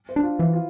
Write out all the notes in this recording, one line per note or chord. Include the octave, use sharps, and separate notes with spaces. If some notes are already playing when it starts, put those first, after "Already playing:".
C5
D4
F4
E3 E4
F4